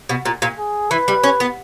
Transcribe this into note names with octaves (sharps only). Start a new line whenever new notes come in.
B2
A#2
A#2
G#4
E3 B4
G3
C#4
B3